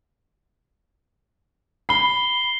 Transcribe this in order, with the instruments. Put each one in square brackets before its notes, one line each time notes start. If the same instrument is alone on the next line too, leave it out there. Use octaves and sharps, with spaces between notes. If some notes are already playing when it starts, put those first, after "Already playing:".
[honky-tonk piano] B5 [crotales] C7 G7